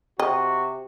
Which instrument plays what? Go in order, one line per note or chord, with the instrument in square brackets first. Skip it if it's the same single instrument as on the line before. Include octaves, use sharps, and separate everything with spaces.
[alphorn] C3 [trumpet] F#4 [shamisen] D#5 [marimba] G5